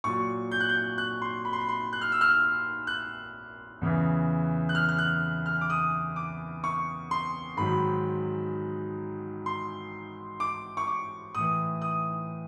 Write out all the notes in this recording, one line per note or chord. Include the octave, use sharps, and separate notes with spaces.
A#2 F#3 C#6
G6
F#6
G6
F#6
C6
B5
C6
B5
C6
F#6
F6
E6
F6
F#6
E2 C#3 E3
F#6
F6
F6
F#6
F6
D6
D#6
D6
C#6
C6
G#2 D#3 F#3 B5
C6
D6
C#6
D6
A2 E3 D#6
D#6